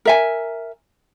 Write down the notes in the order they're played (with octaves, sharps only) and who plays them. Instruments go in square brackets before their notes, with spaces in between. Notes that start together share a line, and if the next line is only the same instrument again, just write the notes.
[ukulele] A#4 E5 G#5